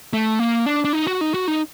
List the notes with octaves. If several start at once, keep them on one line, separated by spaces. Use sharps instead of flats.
A3
A#3
D4
D4
D#4
F#4
D#4
F#4
D#4